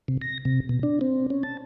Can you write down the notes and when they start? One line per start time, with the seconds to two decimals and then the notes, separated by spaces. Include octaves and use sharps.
0.08 C3
0.22 A#6
0.45 C3
0.69 B2
0.83 D4
1.01 C4
1.30 C#4
1.43 A5